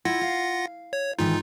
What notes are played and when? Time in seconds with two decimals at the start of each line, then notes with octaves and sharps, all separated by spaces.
0.05 E4 F4 F#5 A#6
0.21 F5
0.93 C#5
1.19 G#2 D#3 E3 D#4 F4